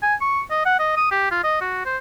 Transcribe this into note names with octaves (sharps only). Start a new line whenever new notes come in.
G#5
C#6
D#5
F#5
D#5
D#6
G4
F4
D#5
F#4
C5